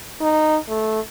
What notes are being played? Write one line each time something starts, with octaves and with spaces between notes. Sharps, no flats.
D#4
A3